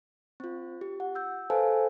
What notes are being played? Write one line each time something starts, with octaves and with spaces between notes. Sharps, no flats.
C4 F4
G4
F#5
E6 G6
A4 B4 C5 F5 G#5 A5